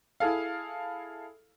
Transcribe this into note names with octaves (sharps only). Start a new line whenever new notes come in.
E4 G#4 A4 F5